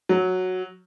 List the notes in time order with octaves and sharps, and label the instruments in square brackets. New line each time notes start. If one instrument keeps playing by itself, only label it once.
[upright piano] F#3